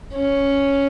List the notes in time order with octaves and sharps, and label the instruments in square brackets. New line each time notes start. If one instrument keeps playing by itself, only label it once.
[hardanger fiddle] C#4